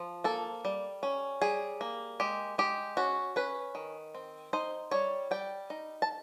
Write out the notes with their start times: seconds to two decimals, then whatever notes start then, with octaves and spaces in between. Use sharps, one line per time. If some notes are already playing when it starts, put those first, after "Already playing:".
Already playing: F3
0.24 A#3 A4
0.65 G3
1.03 C#4
1.42 G3 G#4
1.81 A#3
2.20 G#3 G4
2.58 G#3 G4
2.97 C#4 F#4
3.36 C#4 B4
3.75 D#3
4.15 C4
4.53 D#4 C5
4.91 G3 C#5
5.31 G3 G5
5.70 D#4
6.02 A5